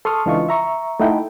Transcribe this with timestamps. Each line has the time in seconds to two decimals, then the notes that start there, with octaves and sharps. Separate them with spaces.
0.05 A4 C6 C#6 D#6 F6
0.26 C#2 E3 D4 F4 D#5 C#6
0.49 E5 A#5 C#6
1.00 A3 D#4 E4 F#5 G5